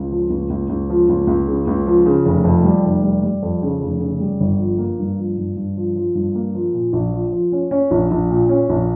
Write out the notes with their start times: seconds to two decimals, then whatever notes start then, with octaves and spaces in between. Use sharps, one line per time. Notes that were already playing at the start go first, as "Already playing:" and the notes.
Already playing: C#2
0.11 F3
0.30 C#2
0.50 C#2
0.69 C#2
0.89 F3
1.09 C#2
1.27 C#2
1.48 C#3
1.67 C#2
1.86 F3
2.06 C#3
2.25 F1
2.44 F2
2.64 G3
2.83 F1
3.03 G3
3.23 G3
3.42 F2
3.62 C#3
3.81 F1
4.00 C#3
4.20 G3
4.40 G1
4.59 F3
4.78 A#3
4.99 G2
5.18 F3
5.38 G2
5.56 G2
5.77 F3
5.96 F3
6.15 G2
6.35 A#3
6.55 F3
6.74 A#2
6.93 A#1
7.13 F3
7.32 F3
7.52 C#4
7.71 C#4
7.91 A#1
8.11 A#1
8.30 A#2
8.49 C#4
8.69 A#1